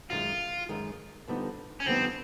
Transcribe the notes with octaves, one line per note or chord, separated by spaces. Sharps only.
F#2 D#3 G#3 F4
F#2 D#3 G#3
F2 D3 G3 B3 D#4
C#4
F2 D3 G3 B3 C4 D#4